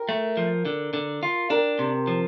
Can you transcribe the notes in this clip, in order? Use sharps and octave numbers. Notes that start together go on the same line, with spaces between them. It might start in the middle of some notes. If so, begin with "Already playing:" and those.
Already playing: A#4
A3
F3
D3
D3
F4
D4 A#4
C3
F3